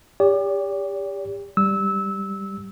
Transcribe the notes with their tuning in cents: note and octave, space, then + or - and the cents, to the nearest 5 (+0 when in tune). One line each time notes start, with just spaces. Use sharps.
G4 +30 D5 -45
G3 +0 E6 -20